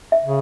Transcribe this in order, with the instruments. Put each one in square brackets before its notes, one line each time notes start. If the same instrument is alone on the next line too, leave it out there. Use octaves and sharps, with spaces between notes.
[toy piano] E5
[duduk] C#3